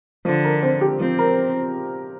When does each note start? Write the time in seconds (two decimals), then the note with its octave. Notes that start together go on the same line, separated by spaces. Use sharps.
0.25 D3 F3
0.44 A#4
0.63 C4
0.81 G4
1.00 F3 C4
1.19 A#4